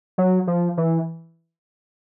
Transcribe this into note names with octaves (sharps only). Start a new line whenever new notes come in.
F#3
F3
E3